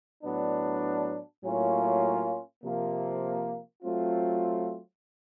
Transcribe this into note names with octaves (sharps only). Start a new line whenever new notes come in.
A2 F#3 B3 D4
A2 F#3 A#3 C#4 F4
C3 F3 A#3
F#3 A3 C4 F4